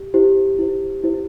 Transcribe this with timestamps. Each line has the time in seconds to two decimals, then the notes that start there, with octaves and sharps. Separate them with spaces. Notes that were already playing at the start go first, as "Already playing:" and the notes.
Already playing: G4
0.14 E4 G4 C5
0.59 E4 G4 C5
1.04 E4 G4 C5